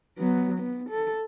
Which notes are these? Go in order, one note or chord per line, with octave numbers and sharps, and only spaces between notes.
F#3 B3
B3
A4